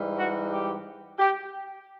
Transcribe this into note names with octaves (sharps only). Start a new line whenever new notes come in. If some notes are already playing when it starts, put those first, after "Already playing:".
Already playing: G#2 E3 G3
F#4
G4
G4